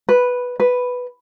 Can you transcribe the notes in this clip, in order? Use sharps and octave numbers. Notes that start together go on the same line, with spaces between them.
B4
B4